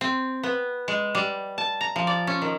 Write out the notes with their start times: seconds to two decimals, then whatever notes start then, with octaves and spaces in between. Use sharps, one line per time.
0.01 C4
0.43 B3
0.88 G#3
1.15 G3
1.58 A5
1.81 A#5
1.96 F3
2.07 D5
2.27 C#4
2.42 D#3